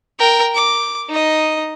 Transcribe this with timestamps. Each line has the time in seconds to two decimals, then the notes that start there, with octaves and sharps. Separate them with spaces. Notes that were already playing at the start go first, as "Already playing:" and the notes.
0.19 A#4 G5
0.54 D6
1.09 D#4 D#5